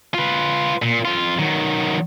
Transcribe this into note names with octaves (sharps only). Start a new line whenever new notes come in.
F4 B4
A#2
F2 F4
D#3 F#3